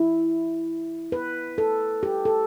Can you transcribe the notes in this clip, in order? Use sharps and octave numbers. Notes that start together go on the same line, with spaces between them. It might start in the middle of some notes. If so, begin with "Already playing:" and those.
Already playing: E4
B4
A4
G4
A4